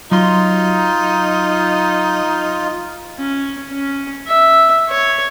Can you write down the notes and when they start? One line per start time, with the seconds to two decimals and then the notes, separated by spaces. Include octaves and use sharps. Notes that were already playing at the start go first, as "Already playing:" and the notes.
0.11 F#3 D#4 F4 C6
3.19 C#4
3.71 C#4
4.27 E5
4.89 C#5